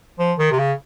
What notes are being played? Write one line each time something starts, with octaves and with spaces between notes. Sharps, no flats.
F3
D#3
C3
C#3